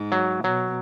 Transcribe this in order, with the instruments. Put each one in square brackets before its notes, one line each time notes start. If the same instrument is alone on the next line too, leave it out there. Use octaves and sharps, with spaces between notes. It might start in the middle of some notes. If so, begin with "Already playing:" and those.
Already playing: [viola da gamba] G#2
[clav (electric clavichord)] F#3
[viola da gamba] B2 [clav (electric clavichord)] F#3